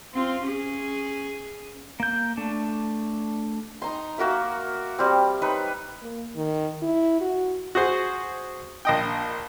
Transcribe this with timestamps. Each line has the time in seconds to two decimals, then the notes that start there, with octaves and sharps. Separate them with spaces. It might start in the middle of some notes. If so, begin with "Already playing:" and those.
0.14 C4 F4
0.43 C#4 G#4
2.00 A#3 G6
2.37 A3 D4
3.82 D#4 A#5 C6
4.18 A#3 F#4 A#4 E5
4.99 G3 C4
5.42 D#4 B4 C#5
6.02 A#3
6.36 D#3
6.82 E4
7.21 F#4
7.75 F#4 G#4 C5
8.85 A#1 D#5 G5